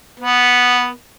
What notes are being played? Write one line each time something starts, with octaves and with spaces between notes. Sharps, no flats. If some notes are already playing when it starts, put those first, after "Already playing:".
B3